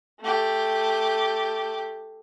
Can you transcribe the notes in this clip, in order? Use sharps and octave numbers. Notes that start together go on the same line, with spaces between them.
A3 G4